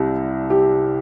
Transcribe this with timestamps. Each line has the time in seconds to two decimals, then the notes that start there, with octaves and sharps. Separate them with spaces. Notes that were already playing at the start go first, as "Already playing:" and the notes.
Already playing: C2 C3 G3
0.50 G4